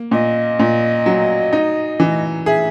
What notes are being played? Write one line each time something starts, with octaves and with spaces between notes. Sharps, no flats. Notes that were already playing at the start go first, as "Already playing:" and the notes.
Already playing: A#3
A#2 D#5
A#2
F#3
D#4
E3
G#4 E5